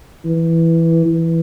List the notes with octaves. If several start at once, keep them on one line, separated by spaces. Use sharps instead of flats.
E3
E3